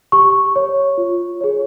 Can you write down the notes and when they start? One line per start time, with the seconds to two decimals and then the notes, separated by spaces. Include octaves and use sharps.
0.12 G4 C#6
0.56 C#5
0.98 F4
1.41 G#4 C#5